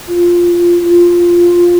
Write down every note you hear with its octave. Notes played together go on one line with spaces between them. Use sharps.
F4
F4